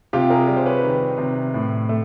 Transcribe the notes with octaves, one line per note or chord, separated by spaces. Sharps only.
C3 F4 G4
G#4 A#4
G3
C5
B4 C#5
D#3
C3
A2
A3